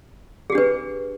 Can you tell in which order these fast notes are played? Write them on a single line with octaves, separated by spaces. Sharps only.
G#4 G4 D4 B4